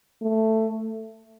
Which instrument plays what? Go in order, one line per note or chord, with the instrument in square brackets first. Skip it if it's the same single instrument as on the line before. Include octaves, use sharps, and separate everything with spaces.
[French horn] A3